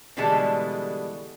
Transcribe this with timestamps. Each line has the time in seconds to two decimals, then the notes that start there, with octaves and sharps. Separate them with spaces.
0.17 B2 D3 E3 G3 G#3 A5